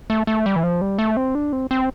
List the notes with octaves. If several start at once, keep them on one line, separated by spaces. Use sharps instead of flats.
A3
A3
G3
E3
F3
G3
A3
C4
D4
C4
C4